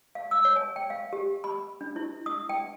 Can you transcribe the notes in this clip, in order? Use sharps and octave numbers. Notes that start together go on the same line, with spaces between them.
F5
E6
C#5
G#5
G5
F5
G4
B5
D4
E4
D#6
G5